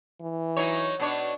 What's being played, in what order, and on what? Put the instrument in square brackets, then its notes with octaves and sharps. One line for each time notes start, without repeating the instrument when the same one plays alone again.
[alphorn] E3
[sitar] F#3 D#4 C#5
B2 D4 C#5